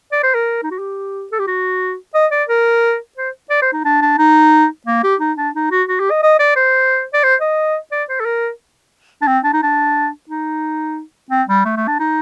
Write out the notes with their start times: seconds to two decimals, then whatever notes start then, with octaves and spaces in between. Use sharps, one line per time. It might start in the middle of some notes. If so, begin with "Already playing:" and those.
0.12 D5
0.23 C5
0.34 A#4
0.63 D#4
0.71 F#4
0.79 G4
1.32 A4
1.39 G4
1.47 F#4
2.15 D#5
2.32 D5
2.49 A#4
3.17 C5
3.50 D5
3.62 C5
3.73 D#4
3.85 D4
4.02 D4
4.18 D#4
4.87 A#3
5.03 G4
5.20 D#4
5.38 D4
5.55 D#4
5.71 F#4
5.89 F#4
6.00 G4
6.11 D#5
6.23 D#5
6.39 D5
6.56 C5
7.14 D5
7.24 C5
7.41 D#5
7.92 D5
8.09 C5
8.20 A4
8.25 A#4
9.22 D4
9.27 C4
9.44 D4
9.53 D#4
9.63 D4
10.29 D#4
11.31 C4
11.49 G3
11.65 A3
11.77 A3
11.88 D4
12.00 D#4